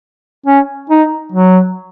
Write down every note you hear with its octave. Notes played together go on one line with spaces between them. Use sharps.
C#4
D#4
F#3